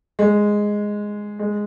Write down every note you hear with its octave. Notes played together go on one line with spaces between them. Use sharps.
G#3
G#3